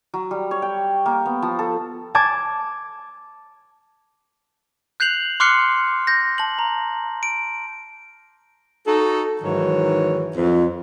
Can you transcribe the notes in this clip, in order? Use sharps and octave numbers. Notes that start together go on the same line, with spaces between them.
F#3
G3
C#5
G5
A#3
B3
F3
A4
A5 D6 G#6
F#6 G6 C7 F7 F#7
C6 D6 F6 F#6 C7 C#7
G6 A#6
A5 F#7
A#5
D7
D#4 F#4 A4
G#2 D#3 E3 F#3 C#5
F2